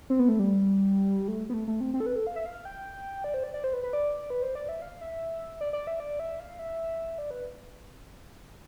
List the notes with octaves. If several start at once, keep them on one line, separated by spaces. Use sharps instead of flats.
C4
B3
A3
G3
A3
B3
A3
A3
C4
C4
A4
B4
A4
F5
E5
F5
G5
D5
C5
D5
D5
C5
B4
B4
D5
B4
C5
D5
E5
F5
E5
D5
D5
E5
D5
E5
F5
E5
D5
B4